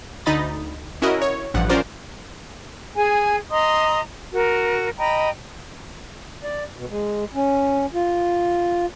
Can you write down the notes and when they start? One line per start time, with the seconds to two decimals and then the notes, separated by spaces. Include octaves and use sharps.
0.26 D2 D#4 D#5 B5 A6
1.02 C#4 E4 F#4 A#4 D#5
1.22 C#5
1.54 A1 G2 F3 F#5
1.69 C#4 F4 A#4 C5 D5
2.95 G#4 G#5
3.50 D#5 A#5 C6 D#6
4.33 F#4 A#4
4.98 D#5 G5 A#5 B5
6.43 D5
6.77 B2
6.90 G#3
7.35 C#4
7.94 F4